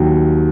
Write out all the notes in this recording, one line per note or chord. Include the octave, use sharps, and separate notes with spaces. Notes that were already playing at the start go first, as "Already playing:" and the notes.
Already playing: D#2 D#3 F#3